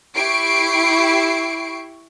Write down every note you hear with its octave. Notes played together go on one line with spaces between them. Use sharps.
E4 G4 C#6 C7 D7